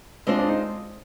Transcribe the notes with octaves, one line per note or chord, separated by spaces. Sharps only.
G#3 C4 D4 F4 C5 D#5
D4
D#4